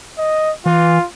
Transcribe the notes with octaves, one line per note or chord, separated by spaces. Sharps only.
D#5
E3 F4